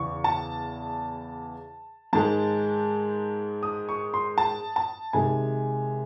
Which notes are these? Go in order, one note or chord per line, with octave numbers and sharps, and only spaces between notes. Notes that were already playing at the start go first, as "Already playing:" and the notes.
Already playing: E2 C#3 E3 C#6
A5
G#2 D#3 G#3 A5
D#6
C#6
C6
A5
A5
C3 D#3 G#3 G#5